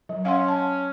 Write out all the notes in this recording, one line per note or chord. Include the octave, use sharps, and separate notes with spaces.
F#3
C#4 F5 F#5 C6
A5